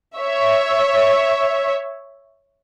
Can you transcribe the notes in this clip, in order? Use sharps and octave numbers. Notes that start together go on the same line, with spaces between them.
C#5 E5